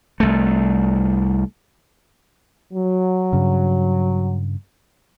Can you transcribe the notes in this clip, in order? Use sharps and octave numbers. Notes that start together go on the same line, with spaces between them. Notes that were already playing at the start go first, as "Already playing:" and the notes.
C2 A3
F#3
G2 C#3